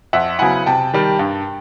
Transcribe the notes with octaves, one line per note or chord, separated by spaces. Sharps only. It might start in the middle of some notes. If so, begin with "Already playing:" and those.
F2 E5 F#5
C#3 F#3 B3 E4 F#5 G#5
C3 G5 A5
D#3 G3
G2